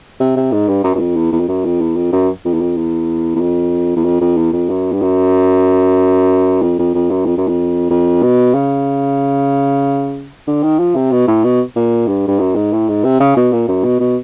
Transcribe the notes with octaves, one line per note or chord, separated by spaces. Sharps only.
C3
C3
G#2
G2
F#2
F#2
F2
E2
E2
F2
F#2
F2
E2
F2
F#2
F2
E2
F2
E2
E2
F2
E2
F2
F2
E2
F2
F#2
G2
F#2
F2
F2
F2
F#2
F2
F#2
F2
F2
B2
C#3
D3
D#3
F3
C3
B2
A2
B2
A#2
G2
G2
F#2
G#2
A2
G#2
C3
C#3
B2
A#2
F#2
B2
B2